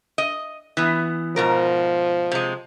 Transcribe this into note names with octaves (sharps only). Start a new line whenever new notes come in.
D#5
E3 B3
G#2 B2 F3 A#4
C3 G#3